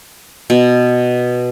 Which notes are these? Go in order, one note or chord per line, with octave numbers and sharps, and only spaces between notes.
B2